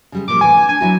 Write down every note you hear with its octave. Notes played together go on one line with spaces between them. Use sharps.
C#3 G3 G#3
A#2 F3 G3 D6
A2 C3 E3 G#5
D#4 A5
D4 G#5
F#3 E4 F#4